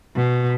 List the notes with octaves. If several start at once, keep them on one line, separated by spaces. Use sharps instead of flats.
B2